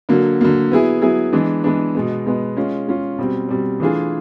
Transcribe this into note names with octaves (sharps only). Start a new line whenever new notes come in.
D3 F#3 A#3
D3 F#3 A#3
F#3 B3 E4 G#4
F#3 B3 E4 G#4
E3 G#3 B3 D4
E3 G#3 B3 D4
B2 G#3 B3
B2 G#3 B3
G#3 C#4 F4
G#3 C#4 F4
B2 G3 C4
B2 G3 C4
E3 A3 D4 F4 G#4